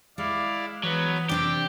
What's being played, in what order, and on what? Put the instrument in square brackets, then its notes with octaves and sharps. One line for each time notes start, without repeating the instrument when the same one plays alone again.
[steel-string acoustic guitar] G#3 [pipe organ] E4 D5 F5
[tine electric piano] E3 [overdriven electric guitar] F#3 [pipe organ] B3 B4
[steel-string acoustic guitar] C3 D4 D5 [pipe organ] C4 [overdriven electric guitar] G4